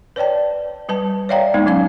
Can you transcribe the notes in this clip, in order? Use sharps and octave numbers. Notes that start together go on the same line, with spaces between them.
B4 C#5 D5 G5 A5
G3 B4 A5
C#5 D5 E5 F5 G5 A#5
G#3 A#3 B3 D#4
F#3 C#4 F5